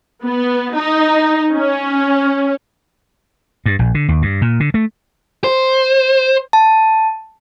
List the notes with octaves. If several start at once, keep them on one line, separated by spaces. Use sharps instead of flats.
B3
D#4
C#4
G2
A#1
D3
D#2
G2
A#2
D3
A3
C5
A5